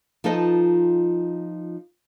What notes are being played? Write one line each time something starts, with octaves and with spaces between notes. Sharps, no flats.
F3 D#4 F4 A4 B4 D#5